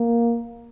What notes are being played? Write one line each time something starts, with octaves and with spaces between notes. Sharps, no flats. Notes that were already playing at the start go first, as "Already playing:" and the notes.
Already playing: A#3